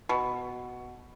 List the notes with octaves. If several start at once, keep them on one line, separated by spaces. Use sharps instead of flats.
B2